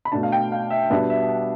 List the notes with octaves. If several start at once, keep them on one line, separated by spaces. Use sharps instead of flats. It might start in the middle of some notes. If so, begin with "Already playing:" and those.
B5
B2 A3 D4 A5
F5
G5
F5
E5
B2 G3 B3 D4 E5
E5